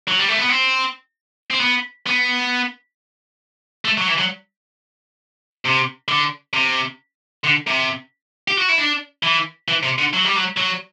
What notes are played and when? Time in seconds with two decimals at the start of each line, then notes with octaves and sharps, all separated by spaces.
0.08 F#3
0.19 G3
0.29 A3
0.38 B3
0.49 C4
1.51 C4
1.60 B3
2.06 B3
3.85 A3
3.97 F#3
4.08 E3
4.18 F#3
5.65 C3
6.09 D3
6.54 C3
7.44 D3
7.67 C3
8.48 G4
8.58 F#4
8.69 E4
8.78 D4
9.23 E3
9.68 E3
9.83 C3
9.99 D3
10.14 F#3
10.25 G3
10.36 F#3
10.57 F#3